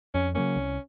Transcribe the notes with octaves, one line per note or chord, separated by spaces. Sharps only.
F2 C#4
C#3 F#3 A#3 C#4
C2